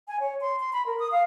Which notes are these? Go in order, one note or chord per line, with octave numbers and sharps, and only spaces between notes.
G#5
C#5
C6
C6
B5
A#4
D#6
F5